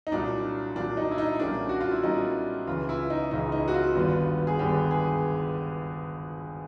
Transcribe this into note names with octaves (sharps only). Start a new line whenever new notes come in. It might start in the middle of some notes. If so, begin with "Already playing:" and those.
D#4
C2 A#2 F#3 D4
C2 A#2 F#3 D4
D#4
E4
D#4
B1 A#2 G3 A#3 C#4 D4
F#4
F4
E4
B1 A#2 G3 A#3 C#4 D#4
C#2 C#3 E3 F4
E4
D#4
C#2 C#3 E3 D#4
D#4
F#4
F4
G#1 G2 D3 G3 B3
G#4
G#1 G2 D3 G3 B3 G4
G#4